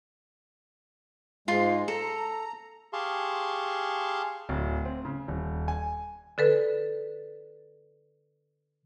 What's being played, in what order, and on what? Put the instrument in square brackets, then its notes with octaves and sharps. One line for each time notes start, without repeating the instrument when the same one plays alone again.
[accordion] G#2 G#3 [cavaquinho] F4 C6
[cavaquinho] A4 [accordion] A#5
[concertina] G4 G#4 F5 A5 C6 C#6
[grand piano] D1
C4
C#3
D#1
G#5
[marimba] D3 A4 B4